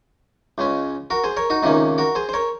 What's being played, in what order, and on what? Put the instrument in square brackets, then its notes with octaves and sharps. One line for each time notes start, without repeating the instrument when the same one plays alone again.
[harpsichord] C#2 C#3 G#3 C#4
F#4 A#4
G#4 C5
A#4 C#5
D#4 F#4
C#2 C3 D#3 A#3 C#4 D#4
F#4 A#4
G#4 C5
C5
A#4 C#5